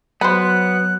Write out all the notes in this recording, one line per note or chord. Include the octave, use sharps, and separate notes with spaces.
F#3 B3 C5 B5 F#6